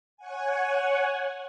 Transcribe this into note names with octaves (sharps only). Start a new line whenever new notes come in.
C#5 F#5 G#5